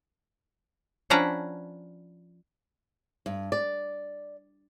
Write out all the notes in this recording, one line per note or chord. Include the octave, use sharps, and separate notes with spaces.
F3 C#4 D4 B4 F#5 A#5
G2
D5